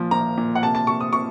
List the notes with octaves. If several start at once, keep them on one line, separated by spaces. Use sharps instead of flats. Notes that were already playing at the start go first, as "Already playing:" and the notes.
Already playing: A#2 F3
A#2 A#5
A#2
F#5
C3 A5
A5
C3 C#6
D#6
C3 C#6